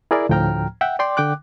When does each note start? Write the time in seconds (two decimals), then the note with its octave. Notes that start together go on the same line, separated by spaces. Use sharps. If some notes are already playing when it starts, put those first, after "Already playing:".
0.11 E4 G#4 A#4 D5
0.29 D2 A2 F3 G5 A#5 F6
0.81 E5 F#5 G5
0.99 D5 G5 C6 D6
1.17 D3 G5 D6 F#6